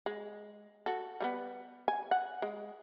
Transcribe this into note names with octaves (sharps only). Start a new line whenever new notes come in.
G#3
F#4 A4
G3 A3 B3
G#5
F#5
G#3